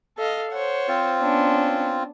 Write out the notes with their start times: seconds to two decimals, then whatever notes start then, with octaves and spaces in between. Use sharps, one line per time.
0.18 A4 D#5 F5
0.51 C5 C#5 F#5
0.88 C4 F4
1.20 B3 C#4 D4